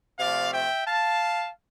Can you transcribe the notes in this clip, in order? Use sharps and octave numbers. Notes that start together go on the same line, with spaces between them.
C3 F3 A3 D5 F5
E5 G5
F5 A5